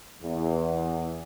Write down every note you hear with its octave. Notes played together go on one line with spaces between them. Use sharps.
E2